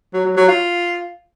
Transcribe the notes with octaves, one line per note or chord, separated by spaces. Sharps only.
F#3
F#3
F#3
F4